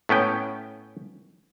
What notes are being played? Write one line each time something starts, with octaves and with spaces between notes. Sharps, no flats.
A2 B3 C#4 G5